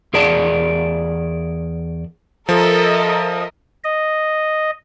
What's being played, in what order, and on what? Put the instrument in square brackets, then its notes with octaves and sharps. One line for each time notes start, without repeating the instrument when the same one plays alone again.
[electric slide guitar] E2 G#4 A#4 D5 A5
[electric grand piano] F3 [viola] A4 [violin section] A#4 D#5 E5
[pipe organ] D#5